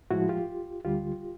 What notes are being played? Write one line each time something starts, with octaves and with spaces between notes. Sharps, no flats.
A2 F3 G#3 E4 F#4
F4 G4
D2 D3 G3 F4 G4